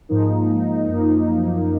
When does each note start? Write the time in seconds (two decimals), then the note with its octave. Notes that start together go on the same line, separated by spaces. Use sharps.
0.09 G#2 F3 A#3 D#4
0.88 F#2 F3 A#3